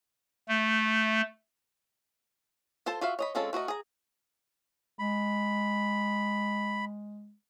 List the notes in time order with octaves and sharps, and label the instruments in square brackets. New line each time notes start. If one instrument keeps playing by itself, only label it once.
[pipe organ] A3
[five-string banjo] F4 A4 C5 A5
F4 F#4 E5 F5
C#5 D#5 B5
G#3 C4 C#4 F4 A4
A3 F#4 A#4 D#5
G#4 A#5
[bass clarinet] G#3 [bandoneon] B5